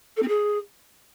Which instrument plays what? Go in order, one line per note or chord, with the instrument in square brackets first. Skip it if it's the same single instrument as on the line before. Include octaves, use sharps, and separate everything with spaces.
[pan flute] A4
C4
G#4